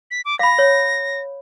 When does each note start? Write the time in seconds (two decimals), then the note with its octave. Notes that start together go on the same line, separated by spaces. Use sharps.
0.11 B6
0.25 D6
0.39 F5 B5 A#6
0.58 C#5